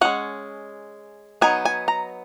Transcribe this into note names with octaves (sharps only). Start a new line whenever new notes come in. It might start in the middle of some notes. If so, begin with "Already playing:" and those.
G#3 C#4 F#5
F#3 B3 D#4 G#5
G#5
A#5